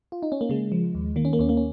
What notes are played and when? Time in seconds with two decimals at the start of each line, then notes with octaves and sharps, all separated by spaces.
0.12 F4
0.23 D#4
0.32 C#4
0.41 A#3
0.49 C#3 G#3
0.72 F3
0.95 D#2
1.16 D#3 A#3
1.25 C#4
1.33 A#3
1.39 D#2 C#4
1.49 A#3
1.57 C#4